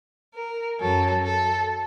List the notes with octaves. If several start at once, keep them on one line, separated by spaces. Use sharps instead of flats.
A#4
F#2 F#3 A4
A4